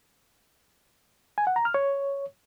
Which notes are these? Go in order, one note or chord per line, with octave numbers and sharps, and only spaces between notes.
G#5
F#5
A#5
F6
C#5